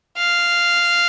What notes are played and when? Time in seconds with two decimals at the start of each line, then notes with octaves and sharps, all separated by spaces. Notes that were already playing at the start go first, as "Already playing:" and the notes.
0.18 F5